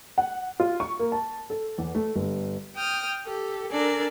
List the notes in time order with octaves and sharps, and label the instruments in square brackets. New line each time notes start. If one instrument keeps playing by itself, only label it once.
[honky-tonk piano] F#5
F4
C#6
A#3
A5
A4
E2
A3
G1
[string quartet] G5 D#6 F6
G4 A4
D4 A4 A#4 D5 G#5